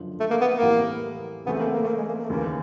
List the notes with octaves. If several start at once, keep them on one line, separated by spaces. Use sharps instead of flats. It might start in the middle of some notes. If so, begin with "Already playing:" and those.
Already playing: F#1 F#2 D3 F3
A3
A#3
B3
A#3
A2 E3 G3 C4 E4
C#3 E3 A3 B3 C4
A#3
A#3
A3
A#3
G#3
A#3
A#3
A3
D#2 C#3 E3 A#3